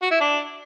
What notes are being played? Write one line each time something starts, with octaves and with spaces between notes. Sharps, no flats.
F#4
E4
D4